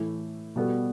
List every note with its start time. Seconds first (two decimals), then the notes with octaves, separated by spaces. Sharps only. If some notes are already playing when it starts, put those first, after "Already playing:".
Already playing: A2 E3 A3 E4
0.56 B2 G3 B3 F#4 A4